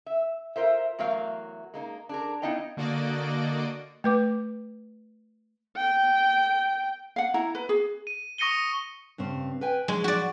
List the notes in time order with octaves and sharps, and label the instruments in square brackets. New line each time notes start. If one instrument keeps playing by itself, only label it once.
[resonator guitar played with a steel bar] E5
F4 A#4 C5 E5
E2 F#3 A3 A#4 F5
G#3 A#3 D#4
D4 G#4 A#4
B3 D#4 E4 D#5 F5 G5
[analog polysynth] D3 A#3 F#4 D5 D#5 D7
[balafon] A3 B4 D6
[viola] G5
[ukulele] F5 F#5
E4 A#5
B4
G#4
[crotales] D#7
C#6 D#6 A#6 C#7 D#7 G7
[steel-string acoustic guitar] G2 C#3 C4
B4 G5 G#5
[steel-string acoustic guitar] F3 F#3 [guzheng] G#3
[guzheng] F#4 D5